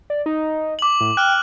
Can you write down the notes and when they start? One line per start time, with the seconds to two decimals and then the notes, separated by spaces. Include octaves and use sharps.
0.10 D5
0.26 D#4
0.79 D6 F#7
1.00 A2
1.17 G5 F6 F#6